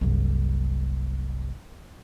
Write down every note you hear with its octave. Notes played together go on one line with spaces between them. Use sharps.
F#1 C2